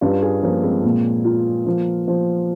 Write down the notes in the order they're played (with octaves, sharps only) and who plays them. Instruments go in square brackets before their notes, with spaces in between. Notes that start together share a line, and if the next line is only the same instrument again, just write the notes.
[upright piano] G2 [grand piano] C#4 F4
[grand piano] F4 G#4
[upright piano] F3 [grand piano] A#3 C#4
[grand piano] G#3 C4
[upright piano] A#2
F4
[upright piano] F3 [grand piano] A#3
[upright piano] F3